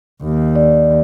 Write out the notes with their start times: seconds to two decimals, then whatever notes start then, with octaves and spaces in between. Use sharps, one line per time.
0.24 D#2
0.55 D5